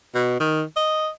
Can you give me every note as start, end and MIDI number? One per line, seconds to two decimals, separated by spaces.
0.15 0.37 47
0.40 0.62 51
0.76 1.09 75